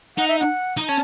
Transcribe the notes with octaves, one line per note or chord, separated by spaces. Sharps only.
D#4 F#5
E5
F#5
D#4
C#4 A5